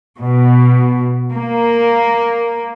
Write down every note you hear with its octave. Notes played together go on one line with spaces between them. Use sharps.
B2
A#3